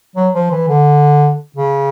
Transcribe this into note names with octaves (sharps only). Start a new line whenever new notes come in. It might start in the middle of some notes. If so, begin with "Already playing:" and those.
F#3
F3
E3
D3
C#3